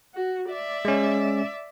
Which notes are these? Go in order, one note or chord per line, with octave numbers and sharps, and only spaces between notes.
F#4
D5 E5
G#3 C#4